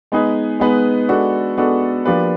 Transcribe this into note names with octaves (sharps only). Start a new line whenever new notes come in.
G#3 B3 D#4 G#4 B4
G#3 B3 D#4 G#4 B4
G#3 B3 D4 F#4 A4
G#3 B3 D4 F#4 A4
F3 A#3 D4 G4 B4